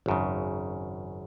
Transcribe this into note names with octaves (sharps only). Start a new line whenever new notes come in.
G#1 F#2 C#3